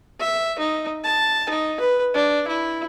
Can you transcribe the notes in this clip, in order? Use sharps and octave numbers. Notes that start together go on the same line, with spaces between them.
E5
D#4
A5
D#4
B4
D4
E4